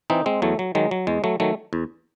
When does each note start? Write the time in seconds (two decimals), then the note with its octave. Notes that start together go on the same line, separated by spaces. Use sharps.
0.10 E3 C4 D#4
0.26 G#3 C4
0.42 E2 F#3 A3
0.59 F#3
0.75 D#3 F#3 G#3
0.91 F#3
1.07 E2 G#3
1.24 F#3 A3
1.40 D#3 F#3 A3
1.73 E2